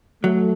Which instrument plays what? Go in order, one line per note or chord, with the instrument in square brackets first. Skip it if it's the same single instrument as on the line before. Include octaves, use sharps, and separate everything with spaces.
[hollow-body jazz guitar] F#3 [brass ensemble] A3